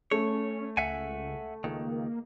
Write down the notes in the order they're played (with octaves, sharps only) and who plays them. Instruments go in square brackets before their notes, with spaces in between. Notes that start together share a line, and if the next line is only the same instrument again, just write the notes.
[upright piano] A3 [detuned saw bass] C#4 [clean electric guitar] C#5
[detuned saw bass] C#2 [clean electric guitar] E5 F#5 G#5
[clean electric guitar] C#2 D#3 [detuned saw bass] A#3